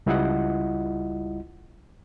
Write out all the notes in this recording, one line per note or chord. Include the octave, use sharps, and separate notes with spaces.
C#2 G3 E4 F4 D#5 F#5